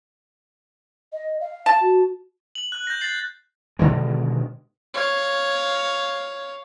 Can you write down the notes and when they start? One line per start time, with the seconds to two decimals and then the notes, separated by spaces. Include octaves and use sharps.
1.13 D#5
1.41 F5
1.66 A5
1.81 F#4
2.55 F#7
2.72 F#6
2.87 G6 A#6
3.01 A6 C7 F#7
3.79 B2 D3 D#3 G#3
4.94 C#5 F5